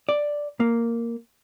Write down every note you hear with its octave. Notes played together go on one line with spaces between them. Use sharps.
D5
A#3